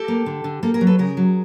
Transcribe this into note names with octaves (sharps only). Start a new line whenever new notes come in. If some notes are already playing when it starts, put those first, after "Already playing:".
Already playing: G4 A4
A#3
D3
D3
A#3 G4 A4
G#4 A#4
F#3
A4 B4
C#3 G#4 A#4
F#3